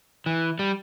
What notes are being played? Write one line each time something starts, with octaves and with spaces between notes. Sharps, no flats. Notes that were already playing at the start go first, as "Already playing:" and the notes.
E3
G3